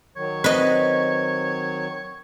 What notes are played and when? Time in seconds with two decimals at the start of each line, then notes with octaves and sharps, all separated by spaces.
0.16 D#3 F#3 C#5
0.44 C4 B4 D#5